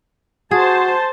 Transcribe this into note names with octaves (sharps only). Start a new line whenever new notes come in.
F#4 G#4 C5 A5